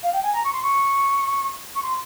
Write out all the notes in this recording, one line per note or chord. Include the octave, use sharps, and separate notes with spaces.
F5
G5
G#5
A#5
C#6
C6
C#6
C#6
C6